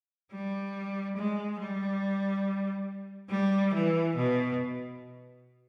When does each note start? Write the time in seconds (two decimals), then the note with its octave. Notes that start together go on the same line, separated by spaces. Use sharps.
0.32 G3
1.16 G#3
1.60 G3
3.30 G3
3.73 E3
4.15 B2